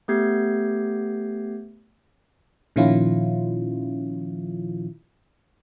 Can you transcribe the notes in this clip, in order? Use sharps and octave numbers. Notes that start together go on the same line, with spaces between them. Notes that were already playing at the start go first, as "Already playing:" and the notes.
A3 B3 G4 G6 G#6 C7
A#2 D#3 F3 C#4 E4 F4